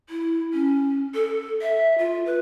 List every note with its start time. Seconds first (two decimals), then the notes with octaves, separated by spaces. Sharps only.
0.09 E4
0.53 C#4
1.15 A4
1.62 E5
1.98 F4
2.26 B4